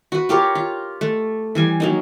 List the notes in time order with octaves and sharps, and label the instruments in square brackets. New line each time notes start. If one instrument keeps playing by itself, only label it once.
[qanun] F#4 B4
F4 G4 A#4 C#5
F4
A3
E3 G3 G#5
F#3 A#3 D#4